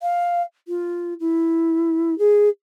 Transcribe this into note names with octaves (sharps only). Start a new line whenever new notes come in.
F5
F4
E4
G#4